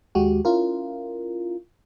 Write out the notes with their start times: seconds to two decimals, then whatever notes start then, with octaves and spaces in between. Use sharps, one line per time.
0.15 D#2 G#3 F#4 G4
0.45 C#4 E4 F4 A#4